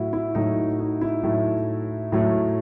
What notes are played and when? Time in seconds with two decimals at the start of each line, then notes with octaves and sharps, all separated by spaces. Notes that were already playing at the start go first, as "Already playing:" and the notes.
Already playing: A2 F#3 A3 E4 F#4
0.13 E4
0.35 A2 F#3 A3 D#4
0.79 D#4
1.01 E4
1.23 A2 F#3 A3
2.12 A2 F#3 A3